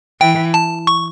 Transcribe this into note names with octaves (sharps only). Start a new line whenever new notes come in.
E3 G5
A5
C#6